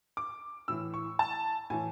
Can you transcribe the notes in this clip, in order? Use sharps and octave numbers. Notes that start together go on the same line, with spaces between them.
D6
A2 E3 E6
C#6
A5
A2 E3 G#5